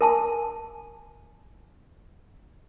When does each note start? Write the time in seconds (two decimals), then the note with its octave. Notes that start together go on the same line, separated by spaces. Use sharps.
0.01 A#4 G#5 A5